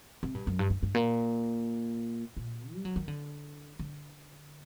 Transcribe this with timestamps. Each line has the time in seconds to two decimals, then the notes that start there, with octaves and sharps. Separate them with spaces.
0.23 C3
0.35 G2
0.47 F#2
0.59 G2
0.70 G2
0.83 G2
0.95 A#2
2.37 A#2
2.73 G3
2.85 F#3
2.96 D#3
3.08 D3
3.79 D3